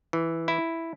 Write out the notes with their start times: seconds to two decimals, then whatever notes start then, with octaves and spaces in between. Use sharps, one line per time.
0.13 E3
0.48 E4